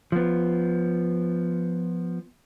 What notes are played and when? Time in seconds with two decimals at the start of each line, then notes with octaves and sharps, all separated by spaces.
0.12 F3 B3